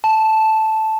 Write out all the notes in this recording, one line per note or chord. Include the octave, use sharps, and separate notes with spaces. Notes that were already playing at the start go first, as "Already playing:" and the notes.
A5